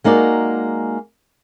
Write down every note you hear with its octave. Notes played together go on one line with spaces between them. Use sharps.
G#3 A#3 D#4 F#4 D5